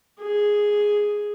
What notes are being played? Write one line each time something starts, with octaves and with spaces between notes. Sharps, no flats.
G#4